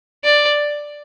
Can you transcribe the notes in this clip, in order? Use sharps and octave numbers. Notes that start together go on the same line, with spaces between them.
D5